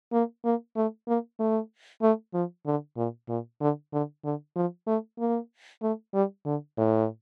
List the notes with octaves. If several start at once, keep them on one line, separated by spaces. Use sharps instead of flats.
A#3
A#3
A3
A#3
A3
A3
F3
D3
A#2
A#2
D3
D3
D3
F3
A3
A#3
A3
G3
D3
A2